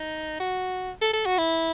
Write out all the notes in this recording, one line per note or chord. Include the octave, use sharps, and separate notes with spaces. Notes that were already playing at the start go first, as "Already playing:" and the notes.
Already playing: D#4
F#4
A4
A4
F#4
E4